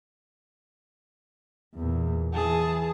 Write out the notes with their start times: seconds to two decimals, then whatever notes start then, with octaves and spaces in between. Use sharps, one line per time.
1.75 E2 A#2
2.34 E3 G#4 A5